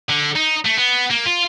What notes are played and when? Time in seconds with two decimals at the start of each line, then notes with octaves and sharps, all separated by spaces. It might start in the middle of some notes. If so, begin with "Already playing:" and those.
0.09 D3
0.35 D#4
0.65 A3
0.77 B3
1.10 A#3
1.25 F4